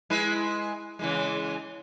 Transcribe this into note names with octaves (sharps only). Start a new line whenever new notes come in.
G#3 E4 B4
C#3 E3 G#3